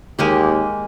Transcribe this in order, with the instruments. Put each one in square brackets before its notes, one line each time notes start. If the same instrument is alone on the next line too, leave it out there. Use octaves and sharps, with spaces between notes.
[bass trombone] D#2 [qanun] G#3 A#3 G4